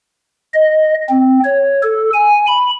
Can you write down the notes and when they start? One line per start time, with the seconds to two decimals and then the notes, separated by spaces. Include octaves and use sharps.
0.54 D#5
1.09 C4
1.44 C#5
1.83 A4
2.14 G#5
2.47 B5